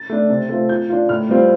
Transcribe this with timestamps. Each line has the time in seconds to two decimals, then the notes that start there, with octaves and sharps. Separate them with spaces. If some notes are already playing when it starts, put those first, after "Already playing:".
Already playing: A6
0.10 A3 D4
0.30 C3
0.49 A3 C4 F4
0.69 F3 G6
0.89 D4 F4
1.09 A2 F6
1.29 G3 C4 F4